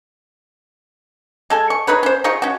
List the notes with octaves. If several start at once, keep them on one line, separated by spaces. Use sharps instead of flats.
G#3 A4 G#5
C#6
D#4 G#4 B4 C#5
C#4 C5
D#4 F4 G#4 C#6
C#4 F#4